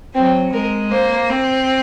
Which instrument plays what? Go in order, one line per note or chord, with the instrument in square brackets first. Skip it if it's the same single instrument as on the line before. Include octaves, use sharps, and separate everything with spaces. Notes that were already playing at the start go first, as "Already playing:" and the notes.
[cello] F#3 [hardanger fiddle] C4
[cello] G#3 [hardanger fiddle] A#4
[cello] A#3 [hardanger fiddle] C5
[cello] C4